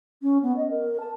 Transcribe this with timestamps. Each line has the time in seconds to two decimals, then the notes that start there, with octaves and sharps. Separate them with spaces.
0.22 C#4
0.43 B3
0.57 D#5
0.71 A#4
1.00 A5